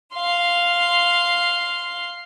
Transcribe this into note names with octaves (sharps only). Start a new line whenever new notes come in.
F5 C6